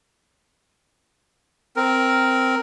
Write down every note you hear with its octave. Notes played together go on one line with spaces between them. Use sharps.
C4 A#4